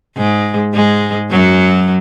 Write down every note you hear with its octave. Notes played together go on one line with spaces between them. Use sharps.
G#2 G#3
G#2 G#3
F#2 F#3